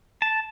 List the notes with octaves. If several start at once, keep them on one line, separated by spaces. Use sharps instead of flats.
A5